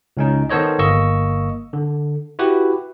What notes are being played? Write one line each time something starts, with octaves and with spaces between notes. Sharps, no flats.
C#2 C#4 D#4
D#3 B3 A4 C5 C#5 D#5
G1 A#3 D#5 C#6 E6
D3
E4 F#4 G4 B4